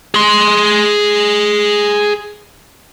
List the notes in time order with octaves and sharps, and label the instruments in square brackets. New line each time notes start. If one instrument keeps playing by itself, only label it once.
[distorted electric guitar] G#4 C6